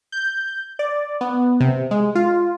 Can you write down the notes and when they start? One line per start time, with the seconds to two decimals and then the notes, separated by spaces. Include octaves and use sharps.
0.12 G6
0.79 D5
1.21 B3
1.60 C3
1.91 G#3
2.15 F4